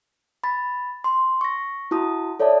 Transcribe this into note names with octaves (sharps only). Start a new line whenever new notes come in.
B5 A6
C6
C#6 A#6
E4 F#4 A5 D#6
A4 C#5 D5 E5 A5